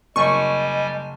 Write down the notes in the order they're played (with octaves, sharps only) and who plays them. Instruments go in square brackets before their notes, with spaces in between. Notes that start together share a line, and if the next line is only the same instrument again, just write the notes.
[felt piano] F#1 C6 [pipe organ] G3 G#5 [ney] D#5 [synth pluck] C#6